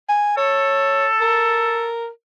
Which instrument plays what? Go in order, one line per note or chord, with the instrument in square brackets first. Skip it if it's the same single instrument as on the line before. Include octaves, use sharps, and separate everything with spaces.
[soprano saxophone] G#5
[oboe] A4 [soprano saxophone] C#5
[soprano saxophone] A#4